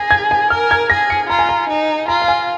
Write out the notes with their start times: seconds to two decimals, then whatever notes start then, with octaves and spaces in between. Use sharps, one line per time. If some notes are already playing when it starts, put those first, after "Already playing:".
Already playing: G#4 A#6
0.11 G#6
0.31 G#5
0.50 A#4 F6
0.71 G#6
0.90 G#4 A#6
1.10 C#7
1.29 F4 A#5
1.39 G#5
1.49 A#5
1.69 D#4
2.08 F4 A#5
2.22 F5
2.28 G#5